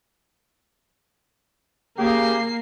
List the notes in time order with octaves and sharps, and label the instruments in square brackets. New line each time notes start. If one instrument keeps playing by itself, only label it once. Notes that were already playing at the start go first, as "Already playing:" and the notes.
[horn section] C#3 G4 G#4 [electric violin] A#3 C7